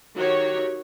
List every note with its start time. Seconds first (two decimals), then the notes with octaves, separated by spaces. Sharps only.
0.17 D#3 F#3 F#4 G4 C#5